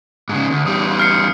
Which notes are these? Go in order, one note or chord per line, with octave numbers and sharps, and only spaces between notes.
G#2 C#3
D2
E2 G3 D#6
F6 C7 C#7